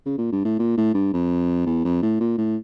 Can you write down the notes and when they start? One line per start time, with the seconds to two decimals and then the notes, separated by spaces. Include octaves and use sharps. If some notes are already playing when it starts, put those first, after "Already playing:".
0.06 C#3
0.18 A#2
0.32 G2
0.45 A2
0.59 A#2
0.77 A2
0.94 G2
1.13 F2
1.66 E2
1.85 F2
2.02 A2
2.20 A#2
2.38 A2